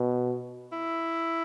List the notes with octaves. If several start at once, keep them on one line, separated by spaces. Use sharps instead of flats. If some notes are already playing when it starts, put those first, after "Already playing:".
Already playing: B2
E4